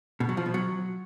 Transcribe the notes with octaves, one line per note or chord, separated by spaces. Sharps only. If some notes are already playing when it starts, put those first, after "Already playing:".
B2
F#3
F3
B2
F#3